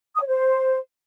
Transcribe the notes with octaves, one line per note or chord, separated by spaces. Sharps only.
D#6
C#5
C5